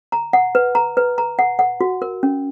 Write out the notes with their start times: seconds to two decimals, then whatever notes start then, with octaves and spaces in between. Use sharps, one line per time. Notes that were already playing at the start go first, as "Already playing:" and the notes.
0.12 A#5
0.33 F#5
0.55 B4
0.75 A#5
0.97 B4
1.18 A#5
1.39 F#5
1.59 F#5
1.81 F#4
2.02 A#4
2.23 C#4